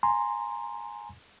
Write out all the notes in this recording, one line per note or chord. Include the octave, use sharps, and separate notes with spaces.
G#5 A#5 C6